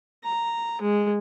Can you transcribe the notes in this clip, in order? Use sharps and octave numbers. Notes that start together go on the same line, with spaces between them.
A#5
G#3